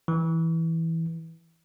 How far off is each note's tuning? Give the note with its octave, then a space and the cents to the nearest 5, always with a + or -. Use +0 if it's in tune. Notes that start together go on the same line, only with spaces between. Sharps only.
E3 -10